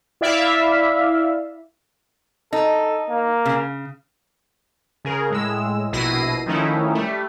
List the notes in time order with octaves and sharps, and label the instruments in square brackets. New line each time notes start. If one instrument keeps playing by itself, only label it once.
[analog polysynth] E4 D5 E5 F5
[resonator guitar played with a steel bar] D#4 [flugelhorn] A4
[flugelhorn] A#3
[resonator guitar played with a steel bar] C#3
[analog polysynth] C#3 G#4 A#4
A2 G#3 E6
A#1 B2 E4 A#6 C7 D#7
D#3 F3 A3 C#4 D#4 E4
G3 A3